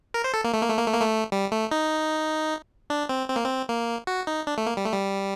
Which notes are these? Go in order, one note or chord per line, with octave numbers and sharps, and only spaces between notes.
A#4
C5
A4
A#3
A3
A#3
A3
A#3
A3
A#3
A3
G3
A3
D#4
D4
C4
C4
A#3
C4
A#3
F#4
D#4
D4
A3
A#3
G3
A3
G3